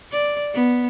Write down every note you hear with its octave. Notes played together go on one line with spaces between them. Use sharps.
D5
B3